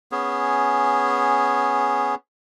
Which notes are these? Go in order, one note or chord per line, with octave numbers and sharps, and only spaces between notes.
B3 C#4 G#4